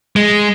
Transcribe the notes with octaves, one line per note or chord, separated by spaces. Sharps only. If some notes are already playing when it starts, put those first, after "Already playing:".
G#3